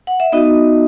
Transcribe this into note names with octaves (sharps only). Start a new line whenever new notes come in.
F#5
E5
B3 D#4 F#4 D#5